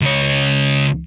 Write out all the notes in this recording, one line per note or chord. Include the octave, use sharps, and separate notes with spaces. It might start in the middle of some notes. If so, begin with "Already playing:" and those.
C#2 C#5